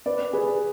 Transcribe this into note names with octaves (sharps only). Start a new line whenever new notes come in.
B4 D5
G#4 B4